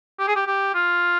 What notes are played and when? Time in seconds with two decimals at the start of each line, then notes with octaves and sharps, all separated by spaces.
0.19 G4
0.28 G#4
0.36 G4
0.47 G4
0.75 F4